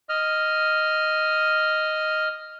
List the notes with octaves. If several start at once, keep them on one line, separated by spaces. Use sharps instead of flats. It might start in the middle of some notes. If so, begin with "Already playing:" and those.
D#5 F6